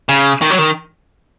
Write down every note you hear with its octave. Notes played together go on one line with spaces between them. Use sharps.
C#3
D#3
F#3
D#3